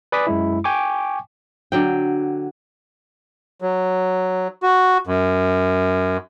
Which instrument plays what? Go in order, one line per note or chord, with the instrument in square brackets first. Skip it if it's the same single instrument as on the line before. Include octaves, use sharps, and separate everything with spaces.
[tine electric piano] B4 D5 G#5 D6 D#6 B6
F#2 G#3 E4
G5 G#5 C#6 D6
[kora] D3 F#3 G5
[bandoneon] F#3
F#4
F#2